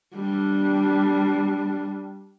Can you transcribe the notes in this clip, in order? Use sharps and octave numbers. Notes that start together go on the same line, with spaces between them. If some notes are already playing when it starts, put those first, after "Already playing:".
G3 D4